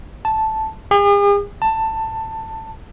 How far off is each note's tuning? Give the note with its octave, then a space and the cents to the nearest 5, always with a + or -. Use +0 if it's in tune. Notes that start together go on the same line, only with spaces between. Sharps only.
A5 -5
G#4 -45
A5 +15